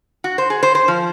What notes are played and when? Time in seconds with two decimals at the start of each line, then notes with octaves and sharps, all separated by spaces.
0.24 F#4
0.38 C5
0.50 G#4
0.63 C5
0.75 C5
0.88 F3